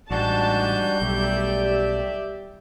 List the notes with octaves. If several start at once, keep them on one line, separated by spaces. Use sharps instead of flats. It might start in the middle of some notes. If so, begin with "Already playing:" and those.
A1 G#2 G3 D4 F#4 A5 G6
B1 A3 G4 D5 E5